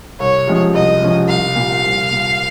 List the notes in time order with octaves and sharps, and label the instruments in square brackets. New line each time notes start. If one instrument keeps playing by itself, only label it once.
[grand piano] C2 [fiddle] C#5
[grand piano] C3 F3 G#3 C#4
[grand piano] C2 [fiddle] D#5
[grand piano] C3 F3 G#3 C#4
[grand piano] C2 [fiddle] F5
[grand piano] A#2 G3
C2
A#2 G3